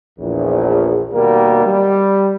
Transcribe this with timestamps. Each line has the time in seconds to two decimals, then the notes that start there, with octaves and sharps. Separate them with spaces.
0.19 A#1 E2
1.13 D#2 B2 G3 A#3
1.66 G3